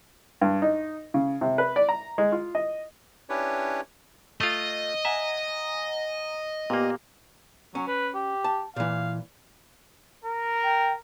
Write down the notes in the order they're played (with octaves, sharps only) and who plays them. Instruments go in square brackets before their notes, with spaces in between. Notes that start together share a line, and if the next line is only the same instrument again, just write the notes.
[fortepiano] G2
D#4
C#3
C3
B4
D5
A#5
G#3
F4
D#5
[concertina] C#4 D4 E4 G4 B4 C#5
[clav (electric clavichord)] A3 F4 [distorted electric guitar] D#5
[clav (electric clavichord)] E5 [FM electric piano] F#5 G#5 A#5
[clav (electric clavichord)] A#2 A#3 [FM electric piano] B3 G4
[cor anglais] F#3 [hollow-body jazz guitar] C#4
[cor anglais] B4
G4
[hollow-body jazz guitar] A5
[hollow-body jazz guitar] A#2 E3 [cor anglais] F5
[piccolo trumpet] A#4
[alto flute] G5